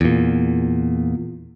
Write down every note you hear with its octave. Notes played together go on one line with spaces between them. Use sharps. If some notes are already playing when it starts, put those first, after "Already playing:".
E2 A#2